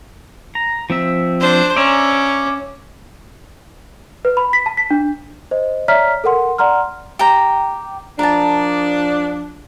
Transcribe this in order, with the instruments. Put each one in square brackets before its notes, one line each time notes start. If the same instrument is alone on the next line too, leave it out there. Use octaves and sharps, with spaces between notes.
[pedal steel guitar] A#5
F3 C4 E5
[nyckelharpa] D4 C5
[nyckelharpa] C#4 [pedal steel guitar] D5 E5 A#5
[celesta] B4
B5
B6
A5
B6
D4
C5 D#5
C#5 D5 E5 A#5 F6 B6
A4 A#4 F#5 C6
D5 F#5 A#5 C6 F6
[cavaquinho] G4 G5 A#5
[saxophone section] F3 D4 [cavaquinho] A#4 A5